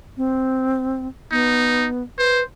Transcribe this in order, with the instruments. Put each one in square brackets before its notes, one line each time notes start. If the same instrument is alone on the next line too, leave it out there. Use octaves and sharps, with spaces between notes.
[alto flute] C4
[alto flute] B3 [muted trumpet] D#4
[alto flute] B4 [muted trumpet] C5